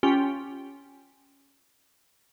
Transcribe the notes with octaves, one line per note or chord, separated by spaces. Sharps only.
C#4 F4 G4 G5